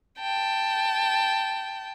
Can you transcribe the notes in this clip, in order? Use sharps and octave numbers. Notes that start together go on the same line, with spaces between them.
G5 A5